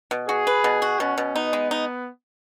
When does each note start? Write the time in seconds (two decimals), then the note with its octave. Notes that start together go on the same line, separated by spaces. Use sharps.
0.11 B2
0.29 F#4 G#4
0.47 B4
0.64 B2
0.82 F#4
1.00 B2 C#4
1.18 B2
1.35 B3 D#4
1.53 G#3
1.71 D#4